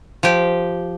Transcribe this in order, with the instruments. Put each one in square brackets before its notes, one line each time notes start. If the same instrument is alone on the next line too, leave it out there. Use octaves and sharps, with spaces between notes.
[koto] F3 G4